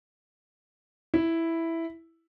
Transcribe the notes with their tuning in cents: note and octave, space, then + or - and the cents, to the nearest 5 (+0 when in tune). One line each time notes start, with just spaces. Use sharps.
E4 +0 E5 +0